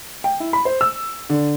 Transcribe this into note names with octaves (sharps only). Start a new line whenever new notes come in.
G5
E4
B5
C5
E6
D3